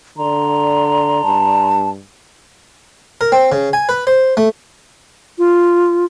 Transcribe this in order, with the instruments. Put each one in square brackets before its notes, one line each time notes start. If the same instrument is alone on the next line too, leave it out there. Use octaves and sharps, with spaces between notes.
[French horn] D3 [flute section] D5 A#5 C6
[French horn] G2 [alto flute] A5
[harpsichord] A#4
C4
C#3
G#5
B4
C5
A3
[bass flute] F4